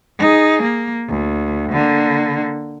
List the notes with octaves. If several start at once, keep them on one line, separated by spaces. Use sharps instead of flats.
D#4 G#4
A#3
D2
D3 A#3